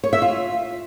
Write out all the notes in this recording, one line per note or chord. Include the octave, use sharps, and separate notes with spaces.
C#5
E5
F4